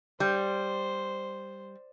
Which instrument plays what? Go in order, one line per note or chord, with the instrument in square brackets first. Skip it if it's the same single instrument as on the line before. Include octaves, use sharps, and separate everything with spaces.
[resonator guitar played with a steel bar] G3 [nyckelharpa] C5